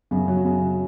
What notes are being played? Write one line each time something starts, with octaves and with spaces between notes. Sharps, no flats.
F#2 C#3
F#3
C#3
F#3